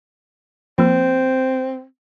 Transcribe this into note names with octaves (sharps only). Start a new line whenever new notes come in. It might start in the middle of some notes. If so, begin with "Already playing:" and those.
F3 A#3 C4